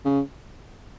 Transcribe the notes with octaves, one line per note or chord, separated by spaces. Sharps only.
C#3